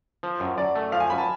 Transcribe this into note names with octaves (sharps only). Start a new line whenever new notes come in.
F3
F#2
F#2 D5
A3
F3 F5
G#5
F#2 B5
A5